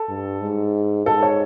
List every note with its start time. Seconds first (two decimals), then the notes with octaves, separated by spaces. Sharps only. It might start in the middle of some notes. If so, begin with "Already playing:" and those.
Already playing: A4
0.09 G2
0.41 G#2
1.06 G#2 A4
1.23 C#5